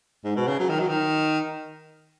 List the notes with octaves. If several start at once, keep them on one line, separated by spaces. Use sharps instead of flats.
G#2
B2
C#3
F#3
D#3
F#3
D#3